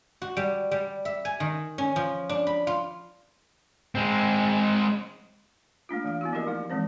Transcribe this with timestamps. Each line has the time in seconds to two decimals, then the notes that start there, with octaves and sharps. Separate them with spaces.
0.22 F#4
0.37 G3
0.71 G3
1.05 E5
1.25 G#5
1.40 D#3
1.78 C#4
1.96 F3
2.29 D4
2.47 B5
2.67 F4
3.95 G#3 C4
5.89 A3 A#3 D4 F4
6.04 E3 A3 F5
6.21 B3 E4 F#4
6.33 F3 A#3 F#4 G4 A#4 D#5
6.46 F3 A3 D#4
6.70 E3 G#3 C4 C5